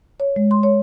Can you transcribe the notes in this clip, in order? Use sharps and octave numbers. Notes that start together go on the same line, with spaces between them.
C#5
G#3
C6
C#5